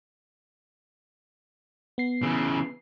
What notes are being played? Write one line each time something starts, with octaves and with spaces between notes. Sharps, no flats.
B3 C7
C#3 E3